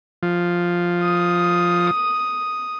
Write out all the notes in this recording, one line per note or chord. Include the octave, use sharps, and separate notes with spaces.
F3
D#6